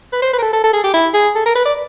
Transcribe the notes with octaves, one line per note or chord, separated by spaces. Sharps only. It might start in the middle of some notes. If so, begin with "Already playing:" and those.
B4
C5
B4
A#4
A4
A4
A4
G#4
G4
E4
G#4
A4
A#4
B4
D5